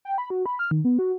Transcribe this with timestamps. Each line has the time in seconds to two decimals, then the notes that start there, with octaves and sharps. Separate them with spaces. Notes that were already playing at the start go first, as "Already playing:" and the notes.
0.05 G5
0.18 B5
0.30 F#4
0.46 B5
0.59 F6
0.71 D#3
0.85 B3
0.99 F#4